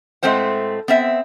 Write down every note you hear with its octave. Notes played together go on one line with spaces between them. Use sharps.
A2 G#3 A3 C4 C5 F#5
B3 C4 E5